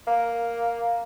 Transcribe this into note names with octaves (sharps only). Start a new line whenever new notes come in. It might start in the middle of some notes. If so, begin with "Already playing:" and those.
A#3